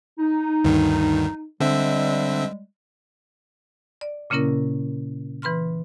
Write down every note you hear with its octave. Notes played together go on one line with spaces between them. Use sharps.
D#4
D2 G2 D#3
D3 G3 G#3 C4 E5
D5
A#2 C#3 A#3 C#4 E4 A#4
E3 B4 B5 C6 F6